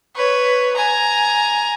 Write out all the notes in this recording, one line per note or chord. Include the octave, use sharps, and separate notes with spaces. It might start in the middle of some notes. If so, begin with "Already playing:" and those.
B4 C#5
G#5 A#5